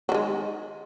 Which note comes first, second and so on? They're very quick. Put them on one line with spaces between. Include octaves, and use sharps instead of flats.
F#3 D#3 G#3